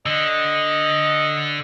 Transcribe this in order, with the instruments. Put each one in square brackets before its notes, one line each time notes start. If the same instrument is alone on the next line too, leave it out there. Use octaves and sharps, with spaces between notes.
[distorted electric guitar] D3 [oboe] D#5